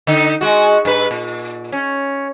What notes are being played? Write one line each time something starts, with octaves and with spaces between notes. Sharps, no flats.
D3 D#4
G#3 F#4
G2 B4
A#2
C#4